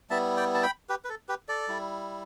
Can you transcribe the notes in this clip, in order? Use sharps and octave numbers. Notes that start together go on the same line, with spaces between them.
G3 B3 E4 E5 A5
D5 G5
A5
G5 B5
G4 B4
B4
A4
G4 B4
A4 D5
G3 E4